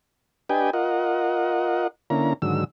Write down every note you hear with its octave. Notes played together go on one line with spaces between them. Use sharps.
D4 G4 B4 D#5 G5 G#5
F4 A#4 D#5 F#5
D3 A#3 C#4 E4 A#5
G#2 D3 D#3 F#3 E6